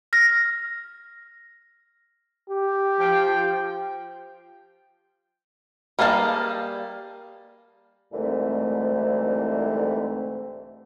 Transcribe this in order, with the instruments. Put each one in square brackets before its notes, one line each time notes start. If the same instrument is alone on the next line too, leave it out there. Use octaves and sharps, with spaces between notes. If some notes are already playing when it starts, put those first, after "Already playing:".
[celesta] F6 A#6
[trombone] G4
[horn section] F3 G5
[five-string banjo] G3 A#3 G#4 F5 A5
[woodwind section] C2 G#2 D3 E3 A3 C4